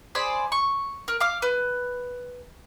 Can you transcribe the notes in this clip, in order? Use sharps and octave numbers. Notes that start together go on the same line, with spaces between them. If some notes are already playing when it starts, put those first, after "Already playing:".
G#4 C5 D5 B5
C#6
A#4
F5 D6 F6
B4